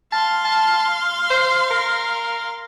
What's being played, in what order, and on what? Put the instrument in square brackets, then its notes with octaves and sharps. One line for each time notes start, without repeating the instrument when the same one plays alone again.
[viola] F5 C6 [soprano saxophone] A5
[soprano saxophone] A5
C5
A#4